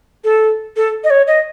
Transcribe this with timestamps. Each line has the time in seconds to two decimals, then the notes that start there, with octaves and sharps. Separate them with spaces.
0.24 A4
0.77 A4
1.04 D#5
1.10 C#5
1.27 D#5